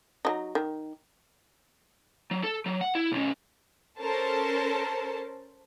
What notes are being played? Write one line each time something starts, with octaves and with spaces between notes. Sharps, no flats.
F#3 D#4
D#3
F#3
A4
F#3
F#5
E4
B1 C#4
C#4 A4 A#4 C5 A5